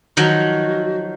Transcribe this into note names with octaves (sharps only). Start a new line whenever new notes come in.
D#3 F3 F#3 F#4